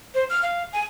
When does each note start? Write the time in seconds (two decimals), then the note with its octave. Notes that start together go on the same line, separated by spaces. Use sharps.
0.15 C5
0.30 F6
0.43 F5
0.73 G#5